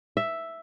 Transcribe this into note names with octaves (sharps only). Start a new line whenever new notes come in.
E5